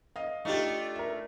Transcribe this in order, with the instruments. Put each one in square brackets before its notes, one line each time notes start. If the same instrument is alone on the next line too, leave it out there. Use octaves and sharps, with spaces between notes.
[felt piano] D#5 F5
[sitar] A3 D4 F4 [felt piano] D#4 G4
[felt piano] A#4 E5